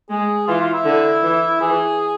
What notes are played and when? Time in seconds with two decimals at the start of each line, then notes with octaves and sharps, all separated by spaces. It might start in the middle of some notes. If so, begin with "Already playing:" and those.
0.10 G#3 G#4
0.48 E3 F4
0.61 F4
0.74 E4
0.85 D3
1.23 E3
1.61 E3 G#4